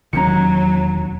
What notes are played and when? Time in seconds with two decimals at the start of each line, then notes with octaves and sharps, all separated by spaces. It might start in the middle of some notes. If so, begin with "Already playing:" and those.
0.13 E1 D#2 D#3 F#3 C#4 A#5 C#7